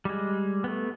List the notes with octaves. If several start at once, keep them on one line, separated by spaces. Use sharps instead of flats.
G3 G#3
A3 B3